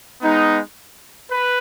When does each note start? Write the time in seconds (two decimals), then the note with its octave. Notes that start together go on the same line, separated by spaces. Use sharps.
0.22 G#3 B3 D#4
1.30 B4